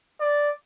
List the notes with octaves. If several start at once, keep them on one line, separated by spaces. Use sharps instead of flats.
D5